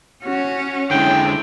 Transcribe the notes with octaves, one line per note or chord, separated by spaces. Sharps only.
C#4 F#4
D3 G#3 E4 G5